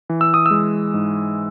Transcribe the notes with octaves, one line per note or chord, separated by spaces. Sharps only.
E3
E6
D#6
G#3 E6
G#2